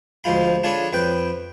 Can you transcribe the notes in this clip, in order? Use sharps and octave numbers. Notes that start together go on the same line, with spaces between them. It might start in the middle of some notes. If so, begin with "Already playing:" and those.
D2 F3 G#3 F4 B5
D4 F4 G#4 A4 C#5 B5
F2 B4 G5